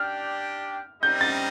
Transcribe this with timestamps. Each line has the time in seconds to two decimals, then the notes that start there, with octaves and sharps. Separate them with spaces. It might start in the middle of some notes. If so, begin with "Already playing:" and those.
Already playing: D4 G4 D5 G5 F6
1.02 G3 C4 D#4 A#4 D#5 G6
1.21 A6